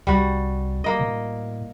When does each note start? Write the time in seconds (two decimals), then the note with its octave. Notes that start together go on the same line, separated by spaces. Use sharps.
0.07 C2 G3 F#4
0.84 A#3 D#5
0.99 A2